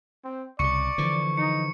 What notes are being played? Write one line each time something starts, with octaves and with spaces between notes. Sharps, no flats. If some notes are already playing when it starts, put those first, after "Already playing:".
C4
C2 C#3 D5 C#6 C#7
D3 E3 F3
D#4 C#7